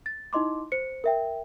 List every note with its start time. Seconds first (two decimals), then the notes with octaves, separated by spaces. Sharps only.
0.06 A6
0.33 D#4 E4 D#5 C6 D6
0.72 C5 C#7
1.04 A#4 E5 G5